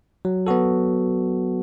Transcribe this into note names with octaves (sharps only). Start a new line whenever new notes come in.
F#3
B3 F#4 A4